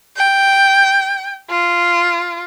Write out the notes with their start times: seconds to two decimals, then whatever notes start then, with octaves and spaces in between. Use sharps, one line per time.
0.17 G5
1.50 F4